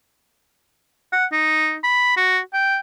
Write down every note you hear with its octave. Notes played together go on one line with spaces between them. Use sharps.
F#5
D#4
B5
F#4
G5